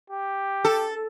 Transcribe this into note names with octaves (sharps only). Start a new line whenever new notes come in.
G4
A4